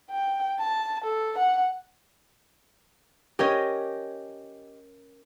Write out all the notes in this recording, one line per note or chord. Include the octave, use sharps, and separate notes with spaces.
G5
A5
A4
F#5
C#4 G4 A#4 C#5 D#5